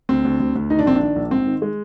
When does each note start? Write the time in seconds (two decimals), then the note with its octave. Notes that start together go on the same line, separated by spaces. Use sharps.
0.09 D2 C4
0.25 D2
0.40 D2
0.55 D2
0.70 D#3 D#4
0.79 D4
0.86 A#1 C4
0.95 D4
1.01 D#3
1.16 A#1
1.31 G#2 C4
1.47 D#3
1.62 G#3